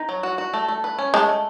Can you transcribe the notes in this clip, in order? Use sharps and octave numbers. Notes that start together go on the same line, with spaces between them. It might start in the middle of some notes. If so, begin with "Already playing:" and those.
Already playing: D#4
F#3
F#4
F#4
A3
A3
B4
C#4
G#3 A3
A3